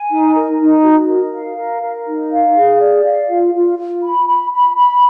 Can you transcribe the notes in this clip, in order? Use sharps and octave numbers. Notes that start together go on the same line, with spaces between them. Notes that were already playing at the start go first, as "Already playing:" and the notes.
Already playing: G#5
D#4
A#4
D#4
F#4
A#4
F5
A#4
A#4
D#4
F5
G#4
D5
F5
F4
F4
F4
B5
B5
B5
B5